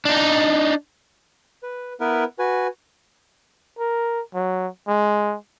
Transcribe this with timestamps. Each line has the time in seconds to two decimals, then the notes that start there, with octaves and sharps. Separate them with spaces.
0.05 D4 D#4
1.62 B4
2.00 B3 E4 A#4 B4
2.39 F#4 B4 G#5
3.79 A#4
4.35 F#3
4.88 G#3